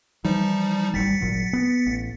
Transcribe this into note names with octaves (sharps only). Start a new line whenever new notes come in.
E3 F3 G3 D#4
G#1 C#2 G3 A6 B6 C#7
G#1 A#2 F#3
B3
A1